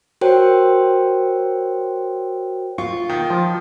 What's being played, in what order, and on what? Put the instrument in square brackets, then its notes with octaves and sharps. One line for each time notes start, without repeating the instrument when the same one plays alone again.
[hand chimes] F#4 A#4 C5 C#5 G5
[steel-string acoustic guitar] F4 [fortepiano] C#6
[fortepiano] D#3
[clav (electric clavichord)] F3